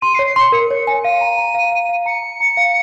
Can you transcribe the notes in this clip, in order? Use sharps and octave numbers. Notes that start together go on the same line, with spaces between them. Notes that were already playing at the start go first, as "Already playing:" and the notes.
C6 D#7
C7
C#5
C7
C6 C#7
A#4 C#7
C#5
G#5
F5 D#7
A#5
A#5
F5
F5
F5
A#5 C#7
A#5
A#5
F5